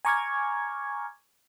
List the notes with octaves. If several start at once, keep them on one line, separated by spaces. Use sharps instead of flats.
G#5 A#5 C#6 D6 F6 G#6